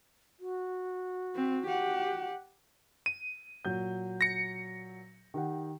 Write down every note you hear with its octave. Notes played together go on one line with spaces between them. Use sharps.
F#4
C4
G4 F#5
D#7
A#2 F#3 G6
A#6 C#7
D#3 G4 F#5